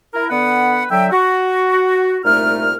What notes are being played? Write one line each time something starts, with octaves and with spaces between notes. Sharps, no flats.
E4 A#4
D3 B3 B4 F#5
D3 F#3 E5 G5
F#4
C2 A#2 A3 D#4 F6